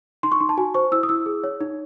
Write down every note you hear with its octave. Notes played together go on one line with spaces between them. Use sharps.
D#4 C6
C#6
D#4 C6
A5
F#4 G#5
C5 C#6
E4 E6
D#6
E4 E6
G#4
C#5
D#4